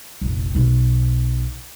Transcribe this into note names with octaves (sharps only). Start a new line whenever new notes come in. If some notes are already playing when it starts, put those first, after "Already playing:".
F1 A#1
B1 B2